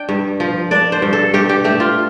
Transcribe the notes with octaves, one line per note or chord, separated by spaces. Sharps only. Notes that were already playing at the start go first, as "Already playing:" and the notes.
Already playing: D4 G5
G2
F3
D4 D5
C5
G2
A4
G2 G4
G4
A3 G4
F4